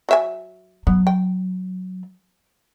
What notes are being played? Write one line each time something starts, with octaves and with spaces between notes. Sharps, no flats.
F#3 E5 G#5
F#3 B3
G5